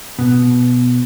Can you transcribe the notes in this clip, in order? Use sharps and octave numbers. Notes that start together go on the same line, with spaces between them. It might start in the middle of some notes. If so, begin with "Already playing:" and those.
B2